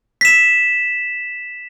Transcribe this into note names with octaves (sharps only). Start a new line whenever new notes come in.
B6 E7